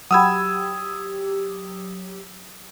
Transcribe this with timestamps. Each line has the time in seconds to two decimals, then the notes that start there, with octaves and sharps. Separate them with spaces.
0.11 F#3 G4 F#5 B5 D#6 E6 G#6